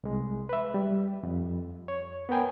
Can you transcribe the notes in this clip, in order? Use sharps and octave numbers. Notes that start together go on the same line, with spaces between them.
C2 G#3
B4 E5
G3
F2
C#5
B3 A#4 G5 G#5